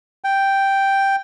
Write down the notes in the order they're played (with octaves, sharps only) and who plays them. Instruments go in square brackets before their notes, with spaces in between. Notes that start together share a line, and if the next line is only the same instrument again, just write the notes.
[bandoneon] G5